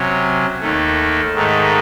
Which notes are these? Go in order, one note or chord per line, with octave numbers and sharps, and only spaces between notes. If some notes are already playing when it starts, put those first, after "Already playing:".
Already playing: C3 F#3 C#4
D#2 D#3 A3
G#2 D#3 A3